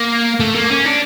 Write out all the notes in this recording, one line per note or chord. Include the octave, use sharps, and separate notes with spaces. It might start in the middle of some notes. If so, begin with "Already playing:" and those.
Already playing: A#3
A3
A#3
C#4
D4